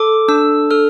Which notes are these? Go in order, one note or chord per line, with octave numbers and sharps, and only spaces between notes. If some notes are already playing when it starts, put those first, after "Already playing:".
Already playing: A4 D6
D4 E6
A4 F6